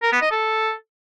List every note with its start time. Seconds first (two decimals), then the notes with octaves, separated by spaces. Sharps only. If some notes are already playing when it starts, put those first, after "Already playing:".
0.03 A#4
0.12 B3
0.22 D#5
0.31 A4